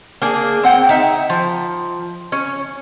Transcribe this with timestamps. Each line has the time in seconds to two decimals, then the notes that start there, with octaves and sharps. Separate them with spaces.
0.22 A#3 D4 G#4
0.63 C4 F#5 G5
0.89 D#4 E5
1.30 F3
2.32 C#4